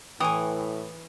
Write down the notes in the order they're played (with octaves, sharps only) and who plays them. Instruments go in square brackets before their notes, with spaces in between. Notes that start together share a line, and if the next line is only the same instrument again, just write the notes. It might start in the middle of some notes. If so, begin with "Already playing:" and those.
[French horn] A2 [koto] E3 [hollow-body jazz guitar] G5 G#5 [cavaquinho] C#6 D#6